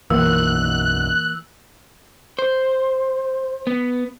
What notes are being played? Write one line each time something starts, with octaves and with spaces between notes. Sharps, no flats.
B1 F#2 E3 A#3 E6 F#6
C5
B3